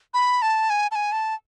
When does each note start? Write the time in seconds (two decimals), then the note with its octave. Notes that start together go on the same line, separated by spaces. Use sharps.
0.14 B5
0.42 A5
0.70 G#5
0.91 A5
0.95 G#5
1.12 A5